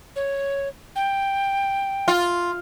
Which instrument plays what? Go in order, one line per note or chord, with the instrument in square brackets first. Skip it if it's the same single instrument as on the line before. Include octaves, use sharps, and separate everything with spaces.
[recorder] C#5
G5
[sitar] F4